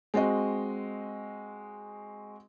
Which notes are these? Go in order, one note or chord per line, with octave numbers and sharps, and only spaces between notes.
G#3 C4 F#4 D#5